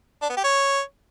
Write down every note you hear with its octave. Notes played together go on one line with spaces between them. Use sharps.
D4
B3
G4
C#5